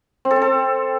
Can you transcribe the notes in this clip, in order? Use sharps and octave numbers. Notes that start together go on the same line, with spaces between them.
C4
A4
C4
A4